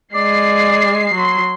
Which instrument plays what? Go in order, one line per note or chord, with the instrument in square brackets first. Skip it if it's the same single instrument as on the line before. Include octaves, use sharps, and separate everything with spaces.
[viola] G#3 [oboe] D5 [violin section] C7
[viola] F#3 C6